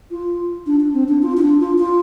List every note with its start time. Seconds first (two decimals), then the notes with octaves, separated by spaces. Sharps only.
0.11 F4
0.67 D4
0.80 D4
0.94 C4
1.08 D4
1.22 F4
1.37 F4
1.42 D4
1.60 F4
1.78 F4